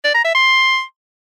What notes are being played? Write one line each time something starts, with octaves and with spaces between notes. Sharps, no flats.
D5
A#5
E5
C6